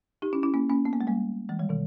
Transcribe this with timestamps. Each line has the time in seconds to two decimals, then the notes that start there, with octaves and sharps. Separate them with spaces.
0.22 D#4 G4
0.33 C#4 E4
0.43 C#4 E4
0.54 A#3 C#4
0.70 A#3 C#4
0.85 B3
0.93 A#3
1.01 G#3
1.07 G3 A#3
1.49 E3 G#3
1.59 D#3 G3
1.69 B2 D#3